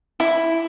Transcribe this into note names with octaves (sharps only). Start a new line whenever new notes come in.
E4